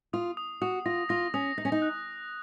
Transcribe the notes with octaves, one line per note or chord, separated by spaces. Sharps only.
F4 D#6
D#6
F#4 D#6
F4 A#6
F4 A#6
C#4 D#6
D#4 A#6
C#4
D#4
F#6